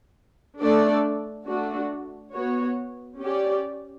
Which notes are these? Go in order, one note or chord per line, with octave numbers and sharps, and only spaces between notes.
A3 D4 A4 D5
A3 D4 F#4
B3 F#4 C#5
C#4 G4 D5